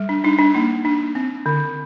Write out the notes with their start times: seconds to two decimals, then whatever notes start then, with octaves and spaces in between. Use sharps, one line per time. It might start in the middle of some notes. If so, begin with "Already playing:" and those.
Already playing: G3
0.09 D4
0.24 D4 D#4
0.39 D4
0.54 A#3 D#4
0.85 D4
1.15 C4
1.46 D3